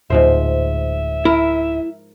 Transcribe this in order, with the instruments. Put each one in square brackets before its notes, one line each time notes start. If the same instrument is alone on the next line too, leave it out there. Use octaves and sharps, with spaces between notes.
[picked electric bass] D1 D2 [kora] G#2 F3 C5 [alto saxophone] E5
[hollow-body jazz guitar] E4 [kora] A#4